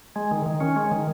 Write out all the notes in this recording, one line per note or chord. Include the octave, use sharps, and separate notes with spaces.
G#3
D#3
D#3
C#4
G#3
D#3